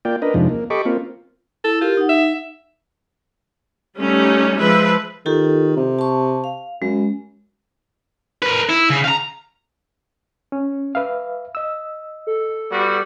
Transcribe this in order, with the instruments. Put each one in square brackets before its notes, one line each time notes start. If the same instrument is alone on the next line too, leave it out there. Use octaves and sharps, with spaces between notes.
[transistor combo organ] A#3 F4 D5 G5
D4 A#4 B4 D#5
F2 C3 F3 G#3 D4 D#4
A#3
G4 A4 D#5 B5 C#6 D6
A#3 C4 F4
[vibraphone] E4 [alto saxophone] A4
[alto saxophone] F4 [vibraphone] G4 A#4
[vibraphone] D#4 F#5
[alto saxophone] E5
[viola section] G3 A3 C#4 D#4
F3 G#3 B4 E5
[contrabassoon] D#3 [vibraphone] F4 G4 A4
[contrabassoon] C3
[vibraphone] A5 C#6
F5
[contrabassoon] F#2 [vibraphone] G#3
[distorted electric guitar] A#4 B4
E4
C#3
F5 A#5
[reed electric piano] C#4
B4 E5 F5
D#5 E6
[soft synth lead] A4
[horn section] G3 B3 F#4